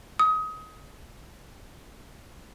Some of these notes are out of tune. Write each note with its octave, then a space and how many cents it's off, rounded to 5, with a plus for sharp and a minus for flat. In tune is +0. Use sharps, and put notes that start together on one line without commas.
D#6 +25